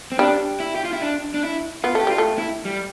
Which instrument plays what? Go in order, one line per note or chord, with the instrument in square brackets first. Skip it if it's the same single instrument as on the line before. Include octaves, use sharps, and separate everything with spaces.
[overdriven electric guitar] C4
[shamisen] G3 [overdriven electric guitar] D4
[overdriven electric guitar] E4
G4
F4
E4
D4
D4
E4
[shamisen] B3 [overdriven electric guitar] F4
[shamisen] A3 [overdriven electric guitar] G4
[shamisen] G3 [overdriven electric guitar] F4
[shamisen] A3
[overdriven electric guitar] E4
G3